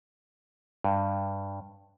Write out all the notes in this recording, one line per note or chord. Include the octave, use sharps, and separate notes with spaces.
G2